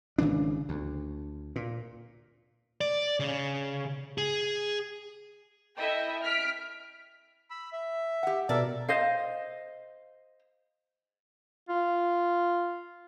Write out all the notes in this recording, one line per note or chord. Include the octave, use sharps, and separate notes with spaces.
G#1 C#3 E3 D4
D2
A#2
D5
C#3
G#4
E4 A4 D#5 E5 G5
F6 B6 D7
B5 E6
E5
G4 F#5
B2 A4 A#4 D5 E5
C5 D#5 F5
F4